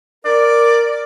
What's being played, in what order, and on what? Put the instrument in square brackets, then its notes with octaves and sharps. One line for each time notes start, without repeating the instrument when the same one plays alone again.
[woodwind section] A#4 [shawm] D5